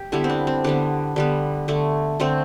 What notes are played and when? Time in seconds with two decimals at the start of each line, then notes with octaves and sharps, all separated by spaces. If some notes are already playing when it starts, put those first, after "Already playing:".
Already playing: G4
0.12 D3 G3 B3 E4
0.24 C4
0.30 D4
0.47 C4
0.64 D3 G3 B3 D4
1.16 D3 G3 B3
1.68 D3 A3
2.20 D3 A3 C4